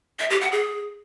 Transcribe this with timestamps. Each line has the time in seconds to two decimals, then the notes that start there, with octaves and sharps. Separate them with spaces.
0.19 E5
0.30 G4
0.41 F#5
0.52 G#4